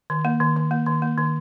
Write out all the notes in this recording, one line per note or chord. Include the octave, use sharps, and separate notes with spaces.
D#3
A#3
D#3
D#3
A#3
D#3
A#3
D#3